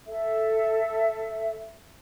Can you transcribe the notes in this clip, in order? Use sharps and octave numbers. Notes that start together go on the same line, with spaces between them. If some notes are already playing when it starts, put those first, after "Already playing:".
A4 E5